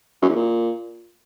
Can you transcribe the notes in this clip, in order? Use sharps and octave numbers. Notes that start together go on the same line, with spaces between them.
F#2
E2
A#2